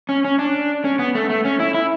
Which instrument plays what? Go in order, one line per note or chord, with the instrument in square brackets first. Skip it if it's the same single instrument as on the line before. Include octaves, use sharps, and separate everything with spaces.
[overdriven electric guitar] C#4
C#4
D4
C#4
B3
A3
A3
C#4
E4
E4